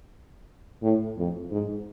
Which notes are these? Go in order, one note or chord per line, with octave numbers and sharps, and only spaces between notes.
A2
F2
G#2